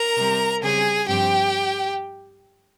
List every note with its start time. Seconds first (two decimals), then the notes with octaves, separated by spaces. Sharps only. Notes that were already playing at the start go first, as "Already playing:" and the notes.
Already playing: A#4 A#5
0.17 C3 G3 C4
0.62 C#3 G3 C4 G#4 G#5
1.08 G2 F3 C4 G4 G5